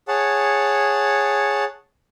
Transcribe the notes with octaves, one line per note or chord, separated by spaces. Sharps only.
G#4 C#5 F#5 A5